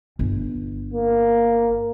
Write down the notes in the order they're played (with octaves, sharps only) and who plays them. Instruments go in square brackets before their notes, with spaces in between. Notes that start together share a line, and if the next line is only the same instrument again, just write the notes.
[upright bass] G1
[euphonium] A#3